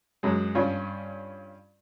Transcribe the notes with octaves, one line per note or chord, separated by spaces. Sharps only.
F#2 F#3 G#3
G2 C#4 F4